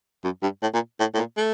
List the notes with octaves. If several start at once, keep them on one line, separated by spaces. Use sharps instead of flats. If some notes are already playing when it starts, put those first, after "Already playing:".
F#2
G2
A2
A#2
A2
A2
A#2
A3